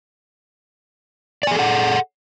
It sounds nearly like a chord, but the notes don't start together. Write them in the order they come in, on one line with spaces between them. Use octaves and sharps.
D5 G#5 G#4 A4 F#5